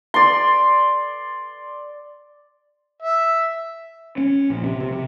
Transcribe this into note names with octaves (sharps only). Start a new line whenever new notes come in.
D5 C6
E5
C#4
A#1
C3
C3
C3